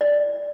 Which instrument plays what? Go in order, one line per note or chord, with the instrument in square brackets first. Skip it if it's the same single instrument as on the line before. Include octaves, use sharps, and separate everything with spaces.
[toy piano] D5